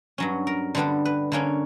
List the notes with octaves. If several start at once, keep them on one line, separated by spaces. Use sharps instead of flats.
G2 F#3 C#4
A#4
D3 G3 B3 D4
B4
D3 A#3 C#4 C#5